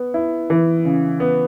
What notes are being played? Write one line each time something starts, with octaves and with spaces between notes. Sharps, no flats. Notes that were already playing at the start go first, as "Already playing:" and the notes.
Already playing: B3
E4
E3
C#3
B3